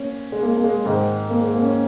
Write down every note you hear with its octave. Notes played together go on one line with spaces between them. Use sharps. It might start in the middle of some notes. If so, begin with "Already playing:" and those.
Already playing: A#3 C#4
G#3
A#3
A#3
G#3
G#2 D#3
A#3
G#3
A#3
C#4